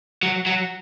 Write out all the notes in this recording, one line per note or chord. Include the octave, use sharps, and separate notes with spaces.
F#3
F#3